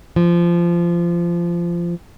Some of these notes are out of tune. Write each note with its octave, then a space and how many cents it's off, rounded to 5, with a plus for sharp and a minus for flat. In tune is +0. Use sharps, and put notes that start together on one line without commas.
F3 -20